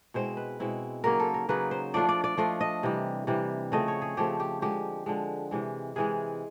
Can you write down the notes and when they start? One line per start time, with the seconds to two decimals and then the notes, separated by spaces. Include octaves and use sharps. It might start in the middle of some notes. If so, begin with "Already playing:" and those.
0.14 B2 G#3 C4 E4 C5
0.37 B4
0.60 B2 G#3 C4 E4
1.04 C#3 F#3 A#3 D#4 A#4
1.20 A4
1.34 A#4
1.49 C#3 F#3 A#3 D#4 B4
1.71 C5
1.94 F3 A3 D4 F4 D5
2.09 D5
2.24 D5
2.37 F3 A3 D4 F4 D#5
2.61 D#5
2.83 C3 E3 G3
3.27 C3 E3 G3
3.72 C#3 F3 A3 C4 D#5
3.88 C#5
4.02 G#4
4.17 C#3 F3 A3 C4 G4
4.40 G4
4.62 D3 F3 G#3 G4
5.06 D3 F3 G#3
5.51 C3 E3 G#3
5.96 C3 E3 G#3 G#4